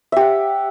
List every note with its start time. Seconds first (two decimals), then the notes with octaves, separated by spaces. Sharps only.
0.12 E5
0.16 G4
0.21 F#5